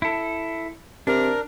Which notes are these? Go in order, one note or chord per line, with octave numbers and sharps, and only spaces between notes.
E4 A4
C3 D4 A#4